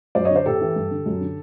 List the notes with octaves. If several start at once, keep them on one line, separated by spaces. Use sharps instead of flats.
F#2 C5 D5
C#5 D#5
D3
C5 D5
A2 G4 A4
E3
G2
D3
F#2
D3